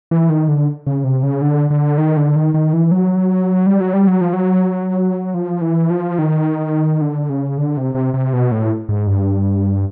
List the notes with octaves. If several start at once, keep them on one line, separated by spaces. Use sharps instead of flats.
E3
D#3
D3
C#3
C3
C#3
D3
D3
D#3
D3
D#3
D#3
E3
F#3
G3
F#3
G3
F#3
F3
F#3
F3
E3
F3
D#3
D3
C#3
D3
C3
C3
C3
B2
A2
G#2
G2